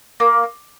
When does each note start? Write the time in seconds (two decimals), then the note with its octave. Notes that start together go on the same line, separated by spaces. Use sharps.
0.20 A#3